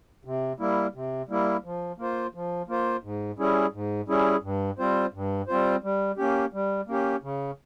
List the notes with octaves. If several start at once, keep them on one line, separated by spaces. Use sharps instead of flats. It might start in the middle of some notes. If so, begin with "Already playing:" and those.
C3
G3 A#3 E4
C3
G3 A#3 E4
F3
A#3 F4 C5
F3
A#3 F4 C5
G#2
G3 C#4 E4 G#4
G#2
G3 C#4 E4 G#4
G2
G3 C4 F4 C5
G2
G3 C4 F4 C5
G3
A#3 C#4 G4
G3
A#3 C#4 G4
C#3